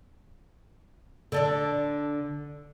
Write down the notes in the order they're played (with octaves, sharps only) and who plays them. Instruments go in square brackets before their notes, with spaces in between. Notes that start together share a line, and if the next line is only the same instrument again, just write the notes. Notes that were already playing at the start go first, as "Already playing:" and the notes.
[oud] D3 A4 D5